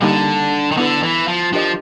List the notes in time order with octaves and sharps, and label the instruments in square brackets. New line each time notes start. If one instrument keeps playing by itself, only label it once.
[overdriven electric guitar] D3 [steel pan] G3 A#3 D#4
[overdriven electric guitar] D#3
[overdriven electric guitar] D3 [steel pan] B3 E4 A4
[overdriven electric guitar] E3
F3
[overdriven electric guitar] F3 [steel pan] D4 G4 A#4 D#5